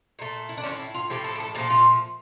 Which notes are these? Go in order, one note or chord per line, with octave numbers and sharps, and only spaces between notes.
A#2 A3
E4
D4
F3 A3 C#4
A2
E4
F4
A2 F3 A3 G4
A4
G4
A4
A#2 F3 A3 G4
F4